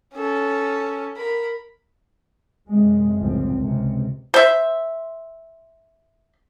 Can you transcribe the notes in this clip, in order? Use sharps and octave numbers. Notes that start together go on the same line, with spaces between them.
C#4 A4
A#4 B5
F#2 C3 G#3
F1 C2 A2 C#3 F3 C4
C#2 C3
C5 E5